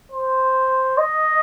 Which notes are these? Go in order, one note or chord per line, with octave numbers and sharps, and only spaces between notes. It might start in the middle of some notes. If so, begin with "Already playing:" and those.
C5
D#5